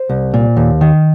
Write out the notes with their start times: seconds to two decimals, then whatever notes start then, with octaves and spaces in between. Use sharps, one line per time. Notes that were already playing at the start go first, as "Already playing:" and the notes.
Already playing: C5
0.09 C2
0.34 A#2
0.57 D#2
0.81 D#3